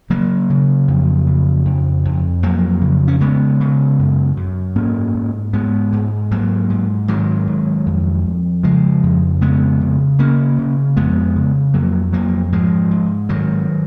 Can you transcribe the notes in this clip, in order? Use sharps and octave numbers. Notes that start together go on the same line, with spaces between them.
C#3 F#3 A#3
C#3
F2
C#3
F2
F2
F2 F#3 A#3
C#3
C#4
C#3 G#3 B3
C#3
F#2
F#2
G#2 A#3 C#4
G#2
G#2 G#3 B3
G#2
G#2 F#3 A#3
G#2
G#2 D#3 F#3
G#2
F2
F2
C#3 F3 G#3
F2
C#3 G#3 B3
C#3
C#3 A#3 C#4
C#3
F2 G#3 B3
C#3
F2 F#3 A#3
F2 F#3 A#3
G#2 F3 G#3
G#2
G#2 D#3 F#3